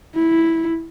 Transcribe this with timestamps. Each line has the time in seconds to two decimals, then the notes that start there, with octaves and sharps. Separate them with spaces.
0.16 E4